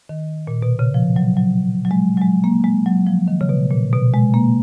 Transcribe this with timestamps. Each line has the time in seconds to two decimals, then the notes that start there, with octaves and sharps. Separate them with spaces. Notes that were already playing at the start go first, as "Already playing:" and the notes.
0.09 D#3
0.47 A#2
0.62 B2
0.79 C#3
0.94 F3
1.16 F#3
1.37 F#3
1.85 F#3
1.91 G#3
2.17 F#3
2.21 G#3
2.44 A#3
2.64 G#3
2.86 F#3
3.07 F3
3.28 D#3
3.41 C#3
3.49 B2
3.71 A#2
3.93 B2
4.13 G#3
4.34 A#3